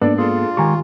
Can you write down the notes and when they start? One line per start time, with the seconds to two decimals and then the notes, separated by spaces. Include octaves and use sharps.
0.02 G#2 A#3 B3 D4 A4 D5
0.18 F4 G#4 A4
0.57 D#3 G#3 G4 G#5 A#5 C#6